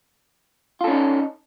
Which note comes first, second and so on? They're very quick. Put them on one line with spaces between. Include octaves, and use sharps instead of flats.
F4 A4 C#4 D#4